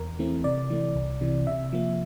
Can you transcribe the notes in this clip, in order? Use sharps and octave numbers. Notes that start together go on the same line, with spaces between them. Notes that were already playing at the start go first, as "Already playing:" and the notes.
Already playing: E2 A#4
E3 A3 C4
C3 D5
E3 A3
C2
C3 E3
C3 E5
F3 A#3